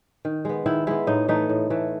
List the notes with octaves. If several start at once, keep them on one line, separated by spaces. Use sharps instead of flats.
D#3
G#3 B3
D#3 E4
G#3 B3 E4
A2 D#4
E3 A3 D#4
A2
E3 A3